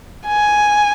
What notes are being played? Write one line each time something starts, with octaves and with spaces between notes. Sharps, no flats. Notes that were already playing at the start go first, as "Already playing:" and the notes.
G#5